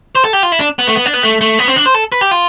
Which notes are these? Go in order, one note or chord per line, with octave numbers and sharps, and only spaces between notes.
C5
A4
G4
F4
E4
D4
B3
A3
B3
D4
B3
A3
A3
B3
C4
D4
C5
A4
B4
G4
F4